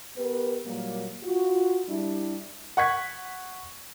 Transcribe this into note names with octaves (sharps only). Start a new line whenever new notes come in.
B3 G4 A#4 B4
A#2 F#3 G3 A#3
F4 F#4
G3 D4 E4
F#5 C#6 G#6 B6